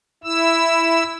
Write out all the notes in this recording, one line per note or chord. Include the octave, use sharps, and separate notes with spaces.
E4 E6